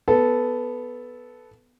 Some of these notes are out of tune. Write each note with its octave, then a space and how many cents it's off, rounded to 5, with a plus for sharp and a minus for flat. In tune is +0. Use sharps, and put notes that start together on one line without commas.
B3 +0 A4 -10